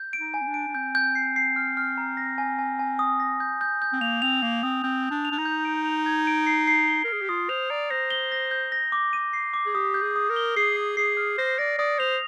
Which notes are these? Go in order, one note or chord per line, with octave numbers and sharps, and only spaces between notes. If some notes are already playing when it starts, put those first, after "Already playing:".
Already playing: G6
D7
D#4
G#5
C4
D4
D7
D4
C4 G6
G6
C7
C7
F6
F6
A#5
A#6
G#5
G#5
G#5
D#6
A#6
G6
G6
G6
C4
A#3 F7
C4 F7
A#3 F7
C4 D#6
C4 G6
G6
D4
F7
D4
D#4
G6
D7
F7
G#6
D7
C7
C7
G7
A#4
G#4 F6
G4
F4 D#6
C5 F7
D5 A#5
C5 A#6
G7
A#6
G6
A#6
D6
D#7
C7
D6
G#4
G4 D#6
G6
G#4
D#6
A#4
G7
G#4 C7
C7
G#4 C7
F6
C5 A#6
D5 A#6
D5 D#6
C5 F7